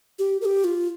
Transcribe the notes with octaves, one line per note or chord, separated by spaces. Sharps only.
G4
A#4
G4
F4